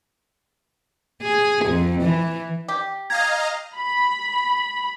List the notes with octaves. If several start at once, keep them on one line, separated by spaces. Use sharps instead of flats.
G#4
F2
E3
G4
D#5 F5 A#5 G#6
B5